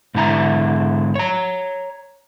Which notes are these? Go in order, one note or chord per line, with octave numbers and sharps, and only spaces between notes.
G#2 D3 E4 A#5
C#5 A#5